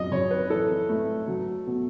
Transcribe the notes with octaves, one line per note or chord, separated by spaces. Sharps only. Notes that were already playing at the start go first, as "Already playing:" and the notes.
Already playing: F#2 D#5
F#2 C#5
B4
E3 A4
A3
F#3
B2